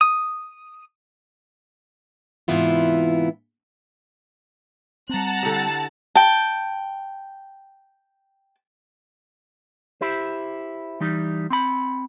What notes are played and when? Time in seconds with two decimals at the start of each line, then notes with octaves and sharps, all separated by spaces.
0.01 D#6
2.48 G#2 C3 E3 B3 E4 F4
5.09 G3 C4 F#5 A5 A#5 F#6
5.43 D3 E4 G4
6.15 G5 A5
10.01 E4 G4 C5
11.01 E3 G3 D#4
11.50 C4 B5